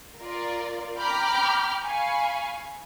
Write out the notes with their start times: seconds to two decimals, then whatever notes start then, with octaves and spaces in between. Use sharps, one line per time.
0.20 F4 A#4 D5
0.98 G5 A#5 B5 D6 F6 G6
1.83 F5 G#5 B5 C#6